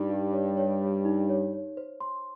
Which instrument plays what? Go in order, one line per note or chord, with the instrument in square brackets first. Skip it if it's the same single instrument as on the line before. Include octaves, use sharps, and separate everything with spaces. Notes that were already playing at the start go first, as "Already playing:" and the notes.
Already playing: [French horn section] G2 G3 [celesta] D#4
[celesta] G4
C#5
C#5
C#5
D#4
C#5
C#5
C5
C6